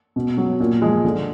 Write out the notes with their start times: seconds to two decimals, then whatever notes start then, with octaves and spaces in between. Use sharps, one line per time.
0.16 B2
0.37 F#3
0.60 A#2
0.82 F3 G#3
1.04 D3